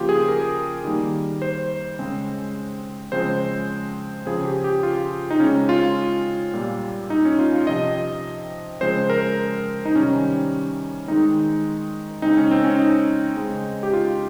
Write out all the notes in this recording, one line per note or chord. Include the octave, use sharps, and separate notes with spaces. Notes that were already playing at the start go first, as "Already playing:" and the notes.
Already playing: C#3 F3 A#3 F4 G4
G#4
A#4
D#3 G3 A#3
C5
C#3 G#3 C4
C#3 F3 G#3 C4 C5
C#3 F3 C4 G#4
G4
G4
F4
D#4
C#3 G#3 C4 C#4
F4
A#2 G3 A#3
D#4
C#4
F4
F4
C3 F3 C4 D#5
C#3 F3 G#3 C4 C5
A#4
D#4
C3 D#3 G3 C#4
D#3 G#3 C4 D#4
C#3 G#3 C4 D#4
C#4
C4
C#4
D#4
C#3 G#3 C4
G4
F4